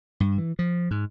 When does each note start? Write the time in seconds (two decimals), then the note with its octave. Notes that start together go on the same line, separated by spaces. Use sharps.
0.20 G2
0.38 E3
0.59 F3
0.91 G#2